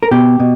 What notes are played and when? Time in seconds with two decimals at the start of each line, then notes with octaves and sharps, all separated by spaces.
0.03 A#4
0.11 B2 G4
0.40 B2